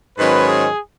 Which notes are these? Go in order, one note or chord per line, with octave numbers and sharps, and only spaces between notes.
G#2 D#3 F#3 C#4 B4
G#4